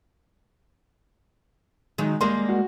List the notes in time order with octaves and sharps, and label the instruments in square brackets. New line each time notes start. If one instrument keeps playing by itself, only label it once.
[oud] D#3 F#3 D#4 [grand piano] G#3
[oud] G3 G#3 A#3 [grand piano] C6
[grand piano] F#4